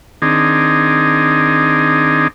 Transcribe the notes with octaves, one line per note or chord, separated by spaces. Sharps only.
D#3 C4 D4 D#4 G#4